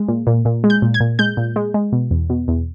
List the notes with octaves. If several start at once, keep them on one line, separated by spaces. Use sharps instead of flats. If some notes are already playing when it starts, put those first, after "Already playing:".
Already playing: G#3
A#2
A#2
A#2
G#3
G6
A#2
G#6
A#2
G#3 G6
A#2
G#3
G#3
B2
E2
B2
E2